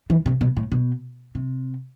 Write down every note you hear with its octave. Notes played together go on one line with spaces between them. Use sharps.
E3
C3
B2
A2
B2
C3